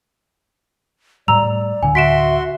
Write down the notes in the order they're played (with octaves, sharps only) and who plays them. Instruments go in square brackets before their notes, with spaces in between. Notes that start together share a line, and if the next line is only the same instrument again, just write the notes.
[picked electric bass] A2 G3 [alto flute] D5 [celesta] A#5 E6 F7
[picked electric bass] D1 D3 [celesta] G#5
[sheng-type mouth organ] F#4 C6 [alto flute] E5 [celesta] B6 D7 E7